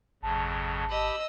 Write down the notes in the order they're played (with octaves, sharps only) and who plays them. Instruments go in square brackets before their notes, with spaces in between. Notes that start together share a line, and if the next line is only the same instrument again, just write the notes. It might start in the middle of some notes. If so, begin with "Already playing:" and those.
[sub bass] G#1 [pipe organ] F2 C#3 F#3 [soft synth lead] A5
[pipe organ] G4 B5 [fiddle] D#5 E6